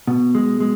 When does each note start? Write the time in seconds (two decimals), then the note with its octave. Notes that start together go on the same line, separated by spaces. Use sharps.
0.07 B2
0.35 G#3
0.60 G#3